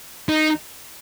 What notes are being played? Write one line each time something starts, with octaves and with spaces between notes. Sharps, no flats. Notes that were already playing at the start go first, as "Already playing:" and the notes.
D#4